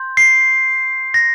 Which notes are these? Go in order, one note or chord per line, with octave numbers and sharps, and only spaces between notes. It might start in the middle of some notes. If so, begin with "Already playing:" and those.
Already playing: C6 G6
C7
A#6